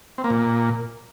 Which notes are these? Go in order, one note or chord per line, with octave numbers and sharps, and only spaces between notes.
C4
A#3
A#2